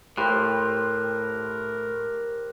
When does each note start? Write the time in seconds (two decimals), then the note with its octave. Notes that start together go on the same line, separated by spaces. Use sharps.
0.17 A2 G4 A#4 C5 B5 F#6